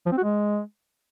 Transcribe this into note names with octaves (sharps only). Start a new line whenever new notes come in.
F3
C4
F#4
G#3